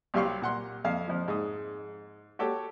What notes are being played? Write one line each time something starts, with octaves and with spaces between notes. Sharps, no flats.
C2 F#3 G4 F5 C6 C#6
A#2 F#5 C6
F2 F5
F2 F3
G#2 D#6
F#4 G4 A4 C#5